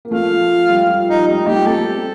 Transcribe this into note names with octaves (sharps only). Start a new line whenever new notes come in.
A#3
F3 A3 F5
F3
F3
G3
F3
F3 D#4
G3 D#4
F3 A3 G4
A3 C4 A4